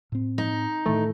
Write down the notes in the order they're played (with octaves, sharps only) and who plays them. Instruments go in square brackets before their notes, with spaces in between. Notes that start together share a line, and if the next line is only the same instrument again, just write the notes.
[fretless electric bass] A2 C4
[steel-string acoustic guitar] D#4
[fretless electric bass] A2 D#3 E3 [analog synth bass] A3